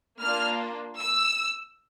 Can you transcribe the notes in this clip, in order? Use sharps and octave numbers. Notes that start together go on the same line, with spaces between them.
A#3 D4 F4 F6
E6